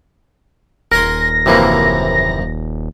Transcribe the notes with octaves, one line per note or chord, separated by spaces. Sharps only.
D#1 A#4 F#5 G#5 C6 A#6
F#2 C3 E3 F3 A#3